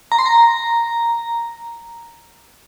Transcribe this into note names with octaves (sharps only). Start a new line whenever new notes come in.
A#5
C6
A#5